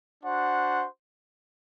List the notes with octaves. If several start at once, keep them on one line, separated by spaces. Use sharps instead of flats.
D4 F#4 C5 F#5